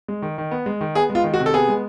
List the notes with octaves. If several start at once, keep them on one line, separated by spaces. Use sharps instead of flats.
G#3
D#3
D#3
B3
G#3
D#3
B3 G#4
G#3
F4
D#3
F#4
C3
A4
B3 G#4
G#3